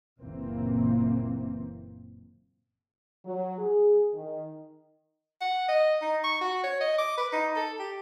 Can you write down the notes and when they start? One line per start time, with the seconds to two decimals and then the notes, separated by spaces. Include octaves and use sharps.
0.21 F#1 A#2 E3 A#3 C4
3.25 F#3
3.58 G#4
4.14 D#3
5.41 F#5
5.68 D#5
6.01 D#4
6.24 C#6
6.41 F#4
6.63 C#5
6.81 D#5
6.98 D6
7.17 B4
7.32 D#4
7.56 A4
7.79 G4